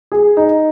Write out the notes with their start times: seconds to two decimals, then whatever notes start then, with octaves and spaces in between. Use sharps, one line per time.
0.12 G#4
0.37 D#4